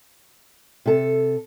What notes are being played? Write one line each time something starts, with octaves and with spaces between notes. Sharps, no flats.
C3 A4